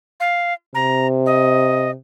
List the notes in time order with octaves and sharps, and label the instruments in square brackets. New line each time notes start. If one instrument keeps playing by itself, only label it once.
[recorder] F5
[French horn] C3 [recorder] A#5
[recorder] D#5